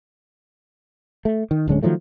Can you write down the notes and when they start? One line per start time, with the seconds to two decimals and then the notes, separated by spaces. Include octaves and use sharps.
1.25 A3
1.51 D#3
1.68 D1 D3 G#3 C#4
1.83 D#3 F3 F#3 A3